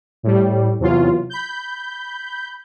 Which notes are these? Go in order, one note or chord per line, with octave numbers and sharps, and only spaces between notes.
A2 G3
E2 C3 E3 F#3 F4
B5 G6